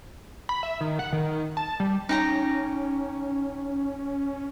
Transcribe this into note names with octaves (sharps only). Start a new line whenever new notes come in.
B5
E5
D#3
F#5
D#3
A5
G3
C#4 D#4 G4 A#5